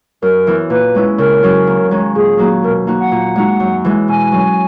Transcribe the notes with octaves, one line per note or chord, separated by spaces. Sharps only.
F#2 A#4
E3 B3
A#2 B4
G#3 C#4 E4
C#3 A#4
F#3 C#4 F#4
D#2
D#3 G#3 C#4
A#2 G#4
F#3 A#3 D#4 F#4
B2 A#4
A#3 D#4 F#4
F#5
A#2
G#3 D#4 F#4
F#2
E3 G#3
B2 G#5
F#3 C#4